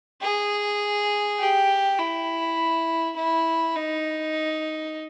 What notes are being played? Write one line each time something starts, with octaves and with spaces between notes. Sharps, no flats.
G#4
G4
E4
E4
D#4